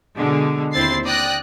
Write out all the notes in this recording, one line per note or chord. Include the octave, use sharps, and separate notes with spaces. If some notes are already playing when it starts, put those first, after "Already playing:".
B2 D3 G#3
D#2 C4 E4 C5 A6 C7
D5 G5 D#6 F#6 A#6